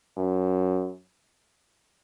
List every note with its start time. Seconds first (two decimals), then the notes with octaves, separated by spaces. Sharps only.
0.17 F#2